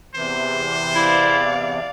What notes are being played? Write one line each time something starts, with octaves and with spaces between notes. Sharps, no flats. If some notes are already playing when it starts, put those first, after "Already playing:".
E2 C3 E3 C5
E4 D5 F5